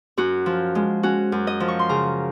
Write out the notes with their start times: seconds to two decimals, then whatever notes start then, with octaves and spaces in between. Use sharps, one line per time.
0.17 F#2 F#4
0.46 F3
0.75 G#3
1.03 C#4 F#4
1.32 F#2
1.47 D#5
1.60 F3
1.68 C#6
1.79 C6
1.89 C#3 A#5